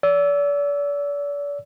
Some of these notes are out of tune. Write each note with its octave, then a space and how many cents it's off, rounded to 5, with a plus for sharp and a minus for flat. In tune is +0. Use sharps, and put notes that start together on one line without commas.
D5 -40 E6 +0